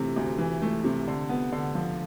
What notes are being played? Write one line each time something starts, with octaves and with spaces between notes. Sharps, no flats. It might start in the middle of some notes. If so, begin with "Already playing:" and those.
Already playing: C3 E3 A3
D2
E3
A3
C3
D3
B3
D3
F3